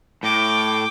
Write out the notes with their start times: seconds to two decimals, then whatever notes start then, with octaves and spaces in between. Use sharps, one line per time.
0.23 A2 G5 D6